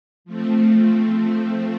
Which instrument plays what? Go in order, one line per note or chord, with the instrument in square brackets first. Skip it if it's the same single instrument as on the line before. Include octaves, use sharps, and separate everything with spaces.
[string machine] F3 A3 C4